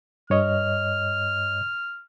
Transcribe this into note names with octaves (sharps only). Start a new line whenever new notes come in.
G2 C#5 D#5 F6